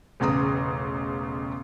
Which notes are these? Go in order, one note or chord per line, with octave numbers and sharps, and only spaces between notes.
E1 A1 C#3 A#5 D#6